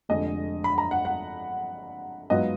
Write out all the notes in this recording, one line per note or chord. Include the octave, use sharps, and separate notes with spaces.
F1 F2 D3 G#3 D#5
B5
A#5
F#5
F#5
G#2 F#3 B3 F4 D#5